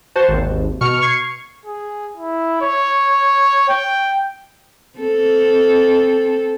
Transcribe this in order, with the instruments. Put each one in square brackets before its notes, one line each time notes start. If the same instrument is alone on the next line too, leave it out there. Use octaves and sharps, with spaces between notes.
[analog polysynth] F#4 C5 A5
G#1 D#2
B2 C#6 F6 C#7
C#6 G#6 C7
[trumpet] G#4
E4
C#5
G5
[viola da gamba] C4 A4